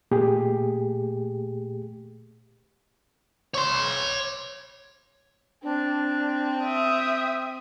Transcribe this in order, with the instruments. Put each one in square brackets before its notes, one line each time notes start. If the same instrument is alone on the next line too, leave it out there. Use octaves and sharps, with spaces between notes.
[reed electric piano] A#2 A3 G4 G#4
[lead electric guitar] C#5 C6
[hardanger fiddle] C4 [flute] D4
[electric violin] E5 D#6 [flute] G5